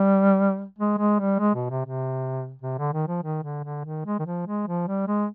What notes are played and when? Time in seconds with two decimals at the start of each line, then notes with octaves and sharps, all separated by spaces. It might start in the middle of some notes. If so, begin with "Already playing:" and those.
Already playing: G3
0.79 G#3
0.98 G#3
1.20 G3
1.39 G#3
1.55 B2
1.70 C3
1.85 C3
2.62 C3
2.78 D3
2.93 D#3
3.08 F3
3.23 D#3
3.43 D3
3.64 D3
3.85 D#3
4.06 G#3
4.19 D#3
4.26 F3
4.47 G#3
4.67 F3
4.87 G3
5.07 G#3